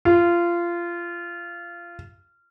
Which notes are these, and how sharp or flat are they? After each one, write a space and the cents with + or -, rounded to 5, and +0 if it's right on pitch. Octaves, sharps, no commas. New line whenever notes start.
F4 -20